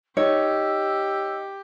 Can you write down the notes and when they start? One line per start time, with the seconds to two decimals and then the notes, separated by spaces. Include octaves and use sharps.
0.17 D#4 G4 C#5 E6